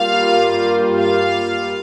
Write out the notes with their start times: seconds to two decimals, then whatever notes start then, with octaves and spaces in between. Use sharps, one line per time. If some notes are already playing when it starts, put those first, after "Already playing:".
Already playing: G2 G3 A#3 F4 F5
0.99 F5